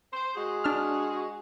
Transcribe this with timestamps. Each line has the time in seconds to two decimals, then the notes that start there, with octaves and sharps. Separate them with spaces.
0.13 C5
0.36 G#3 F#4 G#4
0.64 D4 F6